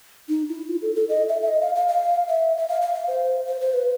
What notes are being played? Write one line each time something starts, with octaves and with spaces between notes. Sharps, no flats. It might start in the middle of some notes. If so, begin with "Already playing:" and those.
D#4
E4
F4
A4
A4
D#5
E5
E5
D#5
F5
F5
F5
E5
E5
F5
F5
F5
C5
C5
C5
B4